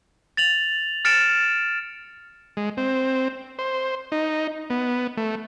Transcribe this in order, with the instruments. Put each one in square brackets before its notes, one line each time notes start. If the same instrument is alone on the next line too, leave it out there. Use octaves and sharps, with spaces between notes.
[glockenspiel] A6 F7 F#7
F6 A6 C#7 D7 E7
[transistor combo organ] G#3
C4
C5
D#4
B3
A3